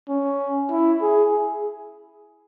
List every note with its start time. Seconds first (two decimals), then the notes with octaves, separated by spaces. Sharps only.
0.09 C#4
0.71 E4
1.02 G#4